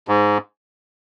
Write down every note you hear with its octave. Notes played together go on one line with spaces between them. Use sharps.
G#2